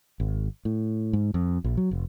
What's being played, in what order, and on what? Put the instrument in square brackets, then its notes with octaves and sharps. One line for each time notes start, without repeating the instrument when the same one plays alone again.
[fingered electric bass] G#1
A2
G#2
F2
A#1
F#3
F1